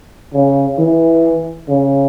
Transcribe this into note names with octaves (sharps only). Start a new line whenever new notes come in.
C#3
E3
C#3